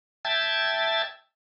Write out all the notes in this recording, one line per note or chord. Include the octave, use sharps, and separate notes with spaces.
E5 G5 A5 G#6 A6